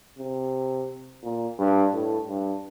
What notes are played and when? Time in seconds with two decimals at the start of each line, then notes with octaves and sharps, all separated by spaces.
0.19 C3
1.24 A#2
1.59 G2
1.93 A2
2.28 G2